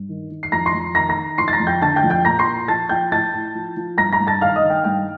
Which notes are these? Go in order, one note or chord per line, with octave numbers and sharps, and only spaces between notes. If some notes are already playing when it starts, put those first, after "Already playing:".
Already playing: G2
D#3
D#3
C7
F2 A#5 A#6
C6 C7
F2
D#3 A#5 A#6
A#5 A#6
D#3
F3 C6 C7
A6
A#5 A#6
F2
G5 G6
D3 A5 A6
G5 G6
F2
G5 G6
A#2 A#5 A#6
C6 C7
A#2
F3 A5 A6
F3 G5 G6
A2 A5 A6
A2
F3
F3
G2 A#5 A#6
A#5 A#6
G2
A5 A6
D#3 F5 F6
D#5 D#6
D#3
G5
G2 G5